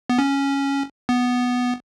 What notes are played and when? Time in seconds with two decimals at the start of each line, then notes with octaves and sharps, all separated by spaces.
0.10 B3
0.19 C#4
1.09 B3